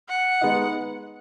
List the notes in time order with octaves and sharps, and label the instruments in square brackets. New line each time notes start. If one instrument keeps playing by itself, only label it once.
[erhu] F#5
[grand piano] G#3 B3 D#4